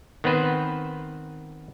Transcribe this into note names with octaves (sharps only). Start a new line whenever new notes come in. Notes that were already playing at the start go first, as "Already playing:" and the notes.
D#3 B3 C4 B4 C5